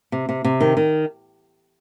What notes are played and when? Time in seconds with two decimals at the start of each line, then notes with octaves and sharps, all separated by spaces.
0.12 C3
0.29 C3
0.44 C3
0.61 D#3
0.77 D#3